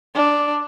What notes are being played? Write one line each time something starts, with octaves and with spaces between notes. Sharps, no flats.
D4